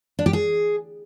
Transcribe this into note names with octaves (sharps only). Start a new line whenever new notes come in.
D4
G4
G#4